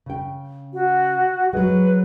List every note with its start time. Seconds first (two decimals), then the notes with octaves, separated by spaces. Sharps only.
0.06 C#3 G5
0.73 F#4
1.53 F#3 G#3 B4